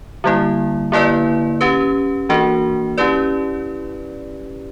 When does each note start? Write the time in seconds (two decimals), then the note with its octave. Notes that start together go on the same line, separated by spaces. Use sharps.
0.24 D3 G3 A#3 E4
0.92 D3 A#3 E4 B4 D5
1.61 C#4 G4 B4
2.29 E3 A#3 D4 F#4 A#4
2.98 C#4 E4 G4 B4 D5